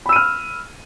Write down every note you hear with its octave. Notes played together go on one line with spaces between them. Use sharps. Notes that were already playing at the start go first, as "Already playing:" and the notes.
B5 E6 F6 D#7